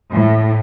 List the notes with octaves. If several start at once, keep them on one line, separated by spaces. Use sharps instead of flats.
A2